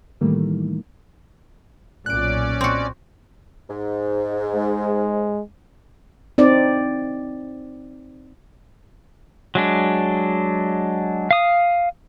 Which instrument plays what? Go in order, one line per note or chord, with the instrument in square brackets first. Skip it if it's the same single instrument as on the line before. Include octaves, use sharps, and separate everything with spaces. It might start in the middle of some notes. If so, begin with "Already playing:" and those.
[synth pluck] A2 D#3 E3 G3 A3 A#3
[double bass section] B1 A#2 [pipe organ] C#4 D5 [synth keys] F#6 D7
[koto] C4 F#4
[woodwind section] G#2
[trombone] G#3
[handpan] C4 D#4 D5
[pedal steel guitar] F#3 G#3 D4
F5 D#6